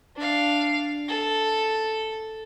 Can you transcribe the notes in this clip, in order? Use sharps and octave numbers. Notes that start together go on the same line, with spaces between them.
D4 F5
A4